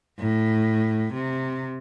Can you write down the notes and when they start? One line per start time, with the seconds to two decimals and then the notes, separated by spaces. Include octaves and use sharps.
0.20 A2
1.14 C3